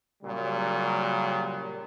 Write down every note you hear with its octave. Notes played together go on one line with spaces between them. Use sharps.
A#2 C#3 F#3 G3